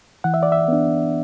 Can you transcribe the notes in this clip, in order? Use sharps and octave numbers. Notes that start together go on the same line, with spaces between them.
E3 F#5
E5
D5
E5
B3 D4